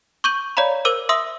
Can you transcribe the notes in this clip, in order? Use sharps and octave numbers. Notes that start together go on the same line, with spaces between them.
C#6 D6 G6 D#7 F#7
C#5 D5 F5 A#5 B5
A#4 C5 D6 E6 D#7
E5 C6 D#6 E6